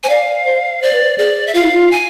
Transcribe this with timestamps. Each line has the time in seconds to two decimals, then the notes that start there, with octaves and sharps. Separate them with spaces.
0.04 C5 G#5
0.09 D5 F5
0.46 C5
0.82 C5 D5
0.93 B4
1.03 C5
1.18 G#4 D5
1.47 E5
1.54 F4 F5
1.63 E4
1.72 F4
1.91 G#5